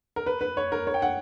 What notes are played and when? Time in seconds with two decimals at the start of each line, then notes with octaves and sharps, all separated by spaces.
0.16 A#4
0.26 B4
0.41 B4
0.57 C#5
0.72 A#4
0.87 C#5
0.94 G5
1.02 F#5